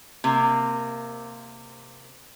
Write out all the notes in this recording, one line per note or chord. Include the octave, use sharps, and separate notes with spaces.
C3 A#3